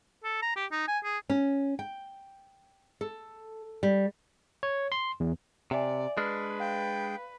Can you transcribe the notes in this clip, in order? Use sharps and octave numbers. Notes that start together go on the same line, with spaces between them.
A4
A#5
G4
D#4
G#5
G#4
C#4
G5
A4
G3
C#5
C6
E2
C3 D5 E5 G#5
G#3 D4 B4 F6
F5 G5